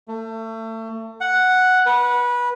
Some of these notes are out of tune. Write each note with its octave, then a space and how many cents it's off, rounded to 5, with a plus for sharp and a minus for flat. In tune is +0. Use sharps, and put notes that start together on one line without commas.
A3 +30
F#5 +0
B4 -20